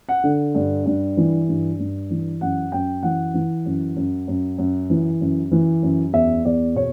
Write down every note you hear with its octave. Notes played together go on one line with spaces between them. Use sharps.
F#5
D3
G2
G2
E3
G2
G2
E3
F#2 F#5
F#2 G5
E3 F#5
E3
F#2
F#2
F#2
F#2
E3
F#2
E3
F#2
E2 E5
E2 D5
B2 C#5